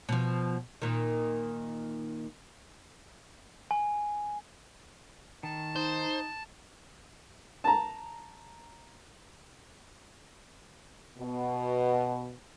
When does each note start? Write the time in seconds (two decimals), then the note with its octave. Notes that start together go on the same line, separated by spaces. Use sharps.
0.09 B2 F3
0.82 A#2 D#3
3.71 G#5
5.43 D#3 A5
5.76 D#4 C5
7.64 A5 A#5
11.17 B2